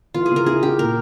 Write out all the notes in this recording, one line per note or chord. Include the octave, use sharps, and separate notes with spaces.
E3 F4
G#4
C#3
A#4
E4 G#4
E4 G4
A#2 A#4